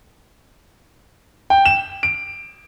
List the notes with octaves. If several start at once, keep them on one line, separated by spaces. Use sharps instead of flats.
G5
E7
D7